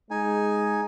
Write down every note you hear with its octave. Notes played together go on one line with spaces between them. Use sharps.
G#3 D#4 G#5